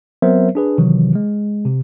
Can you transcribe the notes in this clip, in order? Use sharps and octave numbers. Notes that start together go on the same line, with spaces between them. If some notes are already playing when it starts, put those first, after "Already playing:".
F#3 B3 C4 A#4 C5 E5
D4 G#4 B4
C3 D#3 E3 F#3
G#3
C3